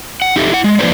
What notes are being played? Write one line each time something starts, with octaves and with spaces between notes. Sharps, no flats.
F#5
D#4 G4 A4 E5
E4 F#5
G#3
F3 A#3 D4 B4 C5 D5